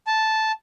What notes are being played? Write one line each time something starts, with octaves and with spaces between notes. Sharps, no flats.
A5